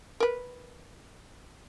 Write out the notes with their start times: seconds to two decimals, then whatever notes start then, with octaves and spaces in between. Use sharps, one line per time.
0.20 A#4 B4